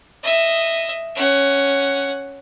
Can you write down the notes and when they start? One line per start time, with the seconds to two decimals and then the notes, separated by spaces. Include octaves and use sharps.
0.23 D#5 E5
1.15 C#4 F#5